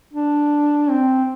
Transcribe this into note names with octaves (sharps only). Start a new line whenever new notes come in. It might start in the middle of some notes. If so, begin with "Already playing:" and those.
D4
C4